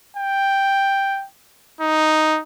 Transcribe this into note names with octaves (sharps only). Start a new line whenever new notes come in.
G5
D#4